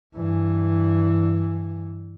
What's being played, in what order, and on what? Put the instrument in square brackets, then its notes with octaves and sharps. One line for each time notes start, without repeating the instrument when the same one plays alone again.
[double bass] G2 E3